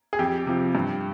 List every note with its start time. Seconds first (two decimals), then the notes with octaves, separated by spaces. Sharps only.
0.13 G#4
0.19 F2 G4
0.46 C3 F3
0.75 G2